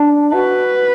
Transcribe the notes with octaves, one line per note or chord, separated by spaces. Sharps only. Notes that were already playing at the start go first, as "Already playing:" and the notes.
Already playing: D4
F#4 B4